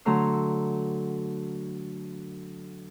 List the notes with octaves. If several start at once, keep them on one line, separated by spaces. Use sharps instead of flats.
D3 F#3 A3 A#5 C6 E6